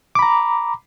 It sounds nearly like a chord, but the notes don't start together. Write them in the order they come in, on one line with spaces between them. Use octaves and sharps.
D6 B5 A#5